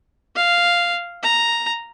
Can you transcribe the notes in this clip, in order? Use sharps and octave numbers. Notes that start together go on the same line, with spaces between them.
F5
A#5